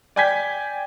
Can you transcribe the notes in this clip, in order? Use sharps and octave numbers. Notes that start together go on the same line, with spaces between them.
D5 G5 G#5 G6 G#6 B6